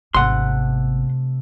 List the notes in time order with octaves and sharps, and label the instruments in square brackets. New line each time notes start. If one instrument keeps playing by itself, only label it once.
[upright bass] G#1 B3 [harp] C3 A3 [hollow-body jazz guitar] F#5 C6